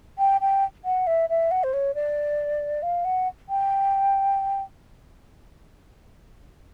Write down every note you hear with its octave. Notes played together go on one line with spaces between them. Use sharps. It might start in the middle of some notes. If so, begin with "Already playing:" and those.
G5
G5
F#5
E5
E5
F#5
C5
C#5
D5
F5
F#5
G5